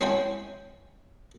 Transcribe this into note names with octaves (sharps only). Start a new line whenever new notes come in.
C4 C#4 E4 G5 G#5